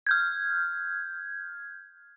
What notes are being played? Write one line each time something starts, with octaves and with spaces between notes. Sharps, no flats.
F6 G6 G#6